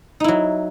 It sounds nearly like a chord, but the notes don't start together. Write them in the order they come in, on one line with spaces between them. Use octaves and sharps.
D#4 E4 F#3